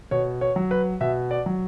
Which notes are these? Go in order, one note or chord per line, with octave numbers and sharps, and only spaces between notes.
B2 C#5
C#5
F#3
B4
B2 E5
D5
F#3